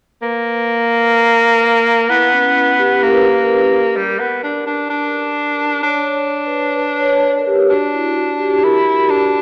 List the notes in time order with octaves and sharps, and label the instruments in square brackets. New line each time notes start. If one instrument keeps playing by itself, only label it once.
[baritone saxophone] A#3 [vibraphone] B4
[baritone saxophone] B3 [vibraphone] E4
[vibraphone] C#4
G4
[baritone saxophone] A#3 [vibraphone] A#4
[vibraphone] B4
A#4
B4
A#4
B4
A#4
[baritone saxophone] G3 [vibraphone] A#4
[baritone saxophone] B3
D4
D4
D4
[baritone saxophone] D4 [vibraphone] C#5
[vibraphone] B4
B4
C#5
B4
A#4
G4
[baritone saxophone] D4 [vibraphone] F#4
[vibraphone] E4
F#4
G4
[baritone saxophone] E4 [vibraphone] A#4
[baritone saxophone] D4
[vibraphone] F#4